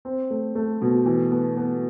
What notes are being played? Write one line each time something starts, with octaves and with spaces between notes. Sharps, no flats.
C4
A3
A3
B2
E3
B3
B3